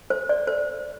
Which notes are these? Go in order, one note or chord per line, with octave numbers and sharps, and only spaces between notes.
C5
D5
C5